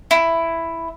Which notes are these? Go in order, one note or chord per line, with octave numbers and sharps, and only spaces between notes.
E4